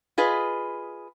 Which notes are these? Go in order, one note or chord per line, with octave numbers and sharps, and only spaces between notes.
F4 G#4 B4 D#5